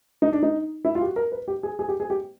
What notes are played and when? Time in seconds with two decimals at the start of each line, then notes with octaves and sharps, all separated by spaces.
0.22 D#4
0.32 D4
0.43 D#4
0.85 E4
0.95 F4
1.01 G4
1.05 F#4
1.16 A#4
1.32 B4
1.48 G4
1.63 G#4
1.79 G#4
1.89 G4
2.00 G#4
2.10 G4